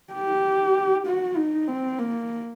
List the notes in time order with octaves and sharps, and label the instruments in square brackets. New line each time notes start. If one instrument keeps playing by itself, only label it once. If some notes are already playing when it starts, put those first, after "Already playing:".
[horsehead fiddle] G4
F#4
D#4
C4
A#3